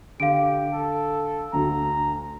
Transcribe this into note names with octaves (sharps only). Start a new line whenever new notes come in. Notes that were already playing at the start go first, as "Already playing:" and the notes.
D3 G4 F5 D7
A4
D2 D3 F#4 A#5